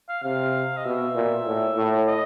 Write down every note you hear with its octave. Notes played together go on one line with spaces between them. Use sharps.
F5
C3 F5
D#5
B2 E5
A#2
A2
A2
D#5